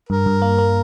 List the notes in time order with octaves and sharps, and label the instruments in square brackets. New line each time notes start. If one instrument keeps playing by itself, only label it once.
[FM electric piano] G2 [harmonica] A#4
[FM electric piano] G2
A#3
A#3